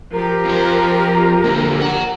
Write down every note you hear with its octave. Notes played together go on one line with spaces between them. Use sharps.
F3 G4 A#4
F2 C5
D3 A#3
F#5 A#5